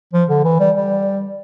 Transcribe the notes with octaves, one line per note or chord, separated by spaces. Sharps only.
F3
D3
E3
G3
G3